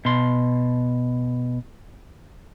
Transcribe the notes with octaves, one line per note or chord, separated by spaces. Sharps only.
B2 C6